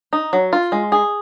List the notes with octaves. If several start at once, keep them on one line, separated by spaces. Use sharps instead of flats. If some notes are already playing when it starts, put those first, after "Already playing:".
D#4
F#3
F4
G#3
G#4